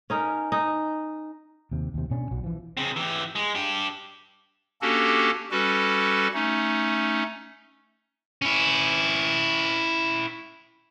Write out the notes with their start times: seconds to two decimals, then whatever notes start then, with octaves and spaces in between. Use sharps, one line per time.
0.10 C#4 D#4 A#4
0.52 D#4
1.71 D#2 C3
1.94 D#2 C3
2.11 B2 C#4 D4
2.31 B1 F#3
2.44 E3 F3
2.77 C#3 C4
2.96 E3 G4
3.35 G#3
3.55 D4 G4
4.82 A#3 C#4 D4 F#4 G4 A4
5.51 G3 C#4 F#4 A4 B4
6.34 A3 C#4 D#4
8.42 C#4 E4